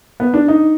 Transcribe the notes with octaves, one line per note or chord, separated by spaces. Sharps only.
B3
D4
D#4